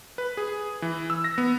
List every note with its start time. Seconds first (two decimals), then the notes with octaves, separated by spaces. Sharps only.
0.18 B4
0.37 G#4
0.82 E3
1.10 E6
1.24 A#6
1.38 B3